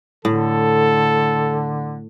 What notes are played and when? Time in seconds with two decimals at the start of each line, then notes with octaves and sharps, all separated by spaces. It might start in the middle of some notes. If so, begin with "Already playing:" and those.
0.25 A2 D3 A4